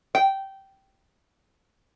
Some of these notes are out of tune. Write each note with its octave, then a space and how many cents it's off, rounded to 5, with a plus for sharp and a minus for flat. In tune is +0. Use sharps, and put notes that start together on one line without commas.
G5 -15